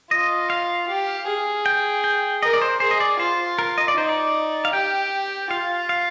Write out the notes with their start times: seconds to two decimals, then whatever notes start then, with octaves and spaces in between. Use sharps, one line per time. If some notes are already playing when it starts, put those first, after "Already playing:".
0.11 F4 D#5
0.50 F5
0.88 G4
1.27 G#4
1.66 G5
2.04 G5
2.42 A#4 D#5
2.53 D5
2.61 C5
2.80 G#4 C5
2.91 D#5
3.00 D5
3.19 F4 C5
3.59 A#4
3.78 D#5
3.88 D5
3.96 D#4 C5
4.09 D5
4.65 F5
4.73 G4 G5
5.50 F4 F5
5.89 F5